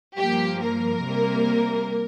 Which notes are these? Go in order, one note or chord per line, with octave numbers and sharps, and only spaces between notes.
G2 F3 A#3 G4
A#4
C3 G3 A#3